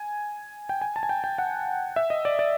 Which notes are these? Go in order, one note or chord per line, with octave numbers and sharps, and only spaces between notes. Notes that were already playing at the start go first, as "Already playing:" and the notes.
Already playing: G#5
G5
G#5
A5
G#5
G5
G5
F#5
E5
D#5
D5
D5